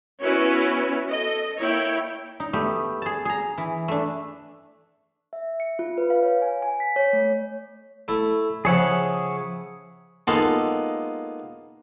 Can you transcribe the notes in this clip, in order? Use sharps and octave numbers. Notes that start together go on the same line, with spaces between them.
B3 C#4 E4 F#4 B4 C#5
A4 D#5
A#3 E4 C#5 G5
D#4
A3 B3 G4
G#4 A5
G#4 A#5
E3
A3 D4
E5
C#7
F4
B4
F5
C#5
G#5
G#5
B6
C#5
A3
A3 E4 A4
C#3 F3 G#4 C#5 E5 F#5
G#3 A#3 B3 D#4 F4 A4